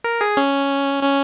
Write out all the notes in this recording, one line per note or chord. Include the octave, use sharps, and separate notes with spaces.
A#4
G#4
C#4
C#4